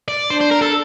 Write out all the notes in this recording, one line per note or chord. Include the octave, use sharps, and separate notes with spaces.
D5
D4 C5
C5
A#4
A4